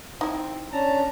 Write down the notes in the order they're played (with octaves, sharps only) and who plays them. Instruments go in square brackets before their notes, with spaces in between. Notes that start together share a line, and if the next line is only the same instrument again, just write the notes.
[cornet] C4 [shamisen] D#4 E4
[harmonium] C#4 D4 A#5 [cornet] A5